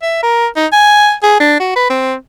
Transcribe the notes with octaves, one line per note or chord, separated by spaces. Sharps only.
E5
A#4
D#4
G#5
G#4
D4
F#4
B4
C4